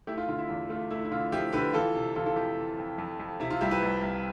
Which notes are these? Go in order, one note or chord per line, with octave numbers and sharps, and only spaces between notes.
A3 E4 G4
F4
D3 F4
E4
E2 F4
A3 F4
A3 E4
E4
D3 F4
F3 E4 G4
D3 G4 B4
E3 F4 A4
C3
E3 F4 A4
F4 A4
F2 E4 G4
E3
F2
F2
F2
C3 E4
F4
C2 E4 G4
G4 B4
C2
C2